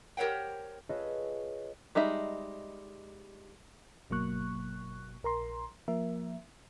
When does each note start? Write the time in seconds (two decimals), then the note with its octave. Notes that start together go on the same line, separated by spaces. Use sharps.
0.17 G4 A#4 C5 C#5 F#5 G5
0.89 F4 G#4 A4 B4 C#5 D#5
1.95 G3 G#3 D#4 E5
4.10 G1 B2 F#3 A#3 C#6 F#6
5.23 A#1 A#4 A#5 C6
5.88 F3 A#3 A#4 E5